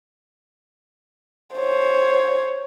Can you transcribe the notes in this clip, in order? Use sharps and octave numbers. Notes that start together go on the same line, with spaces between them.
C5 C#5